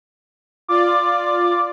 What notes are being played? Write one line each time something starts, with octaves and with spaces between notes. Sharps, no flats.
F4 D5 D6